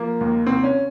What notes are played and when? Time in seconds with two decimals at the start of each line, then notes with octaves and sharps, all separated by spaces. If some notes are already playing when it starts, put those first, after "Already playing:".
Already playing: F3 A#3
0.21 D#2
0.46 C2 C4
0.63 C#4